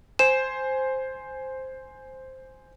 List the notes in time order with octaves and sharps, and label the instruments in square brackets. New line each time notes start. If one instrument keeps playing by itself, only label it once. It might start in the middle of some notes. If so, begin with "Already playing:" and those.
[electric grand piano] C5 G#5 [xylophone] E7